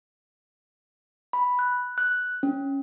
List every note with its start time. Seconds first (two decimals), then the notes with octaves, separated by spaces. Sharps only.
1.33 B5
1.59 F#6
1.98 F#6
2.43 C#4